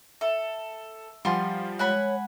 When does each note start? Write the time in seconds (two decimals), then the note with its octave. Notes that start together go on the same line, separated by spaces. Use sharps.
0.21 A4 E5
1.25 F3 G3 F4 F#5 G#5 C6
1.79 G#3 C#5 F#5 G#5 B5